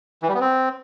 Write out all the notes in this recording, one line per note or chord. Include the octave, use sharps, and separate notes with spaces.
E3
G3
B3
C4